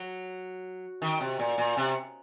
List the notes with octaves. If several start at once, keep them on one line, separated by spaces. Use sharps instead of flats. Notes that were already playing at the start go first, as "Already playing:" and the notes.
Already playing: F#3
D#3
C3
A#2
A#2
C3